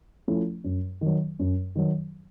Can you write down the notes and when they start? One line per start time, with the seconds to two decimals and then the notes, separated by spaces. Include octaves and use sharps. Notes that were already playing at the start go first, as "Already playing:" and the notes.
0.28 F3 A3 C#4 E4
0.64 F#2
1.01 D#3 F#3
1.39 F#2
1.76 D#3 F#3